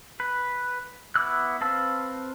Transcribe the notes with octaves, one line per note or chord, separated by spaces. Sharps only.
B4
B3 E4 D6 E6 F#6
C4 B4 F5 A5 E6